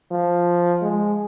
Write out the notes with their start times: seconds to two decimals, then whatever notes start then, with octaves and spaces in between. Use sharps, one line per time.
0.11 F3
0.82 G#3